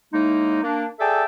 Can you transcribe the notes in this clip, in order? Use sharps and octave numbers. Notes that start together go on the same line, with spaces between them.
A2 G#3 A#3 D#4
A#3 D4
G#4 A4 D5 E5 G5 A5